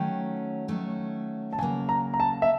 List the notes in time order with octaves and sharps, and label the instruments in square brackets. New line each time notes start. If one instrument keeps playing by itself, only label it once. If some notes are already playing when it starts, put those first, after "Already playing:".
Already playing: [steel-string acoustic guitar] D#3 F#3 A3 C#4 [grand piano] G5
[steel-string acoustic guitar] D#3 F#3 A3 C#4
[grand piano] A5
[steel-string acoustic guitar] C#3 F#3 A#3 [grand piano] G#5
[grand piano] A#5
A#5
A5
E5